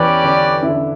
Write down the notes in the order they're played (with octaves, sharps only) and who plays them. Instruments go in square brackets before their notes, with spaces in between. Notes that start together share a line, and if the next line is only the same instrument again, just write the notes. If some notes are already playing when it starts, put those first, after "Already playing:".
Already playing: [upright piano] E2 E3 [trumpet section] C#4 G4 B4 D5
[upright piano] D3 D4
E4
D3 D4